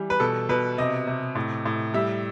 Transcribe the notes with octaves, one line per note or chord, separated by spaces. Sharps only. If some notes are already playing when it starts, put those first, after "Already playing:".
Already playing: E3 G3
B4
B2 A4
B2 B4
C3 D#5
C3
A2
A2
G3 E5